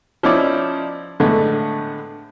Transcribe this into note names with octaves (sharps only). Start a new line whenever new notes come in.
F3 C#4 D#4 E4 C#5 D5
A2 D3 G#3 A3 B3